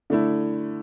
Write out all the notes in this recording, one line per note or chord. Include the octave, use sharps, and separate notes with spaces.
D3 A3 E4